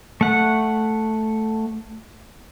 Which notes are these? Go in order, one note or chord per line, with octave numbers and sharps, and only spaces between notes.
A3 F#5